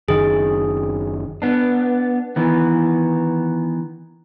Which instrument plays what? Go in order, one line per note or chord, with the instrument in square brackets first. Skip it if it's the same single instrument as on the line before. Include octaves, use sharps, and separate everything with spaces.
[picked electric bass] F#1 D#3 [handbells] G#4
[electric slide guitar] B3 D4
D#3 E3 B3